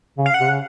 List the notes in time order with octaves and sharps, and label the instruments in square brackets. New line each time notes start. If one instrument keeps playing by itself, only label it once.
[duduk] C#3
[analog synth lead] F5
F#5
[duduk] C3
C#3